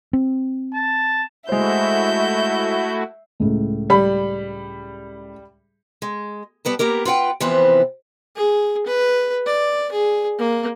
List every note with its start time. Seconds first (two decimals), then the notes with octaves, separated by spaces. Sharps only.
0.13 C4
0.74 A5
1.49 G#3 A3 E4 F#4 C5 E5 G6
3.40 C#2 A2
3.90 G3 B5
6.02 G#3
6.65 G3 B3 B4 A5
6.79 A#3 B3 G4 A#4
7.05 F4 B4 F#5 G5
7.40 C3 E3 F3 B3 C4
8.36 G#4
8.86 B4
9.46 D5
9.92 G#4
10.39 A#3